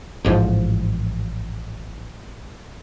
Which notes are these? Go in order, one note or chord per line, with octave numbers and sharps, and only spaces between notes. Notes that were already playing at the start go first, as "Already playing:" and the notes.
A1 G#2 F3